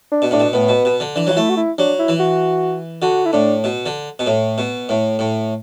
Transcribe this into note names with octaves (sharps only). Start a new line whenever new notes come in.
D4
B2
A2 D4
B2
A2 B3
B2
B2
D3
E3 D4
F#3
F#4
A3 E4
F#4
E4
F#3 D4
E4
E3
F#4
D3 F#4
E4
A2 D4
B2
D3
B2
A2
B2
A2
A2